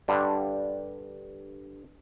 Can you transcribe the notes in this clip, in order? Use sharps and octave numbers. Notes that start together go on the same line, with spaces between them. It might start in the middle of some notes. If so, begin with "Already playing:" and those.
G2 D3 G3 D4